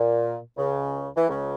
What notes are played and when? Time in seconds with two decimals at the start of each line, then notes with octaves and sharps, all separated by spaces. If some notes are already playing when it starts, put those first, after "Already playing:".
Already playing: A#2
0.57 C#2 C#3
1.17 E3
1.29 C#2 C#3